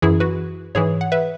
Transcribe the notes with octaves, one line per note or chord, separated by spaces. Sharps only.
F#2 E3 E4 G#4
F#4 B4
G#2 E3 G#4 C#5
F#5
B4 E5